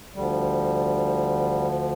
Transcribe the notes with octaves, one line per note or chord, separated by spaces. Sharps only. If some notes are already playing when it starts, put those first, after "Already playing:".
D2 D3 F3 G3